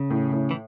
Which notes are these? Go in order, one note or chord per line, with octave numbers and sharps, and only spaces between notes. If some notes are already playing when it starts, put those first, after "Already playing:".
Already playing: C#3
A2
A2
E3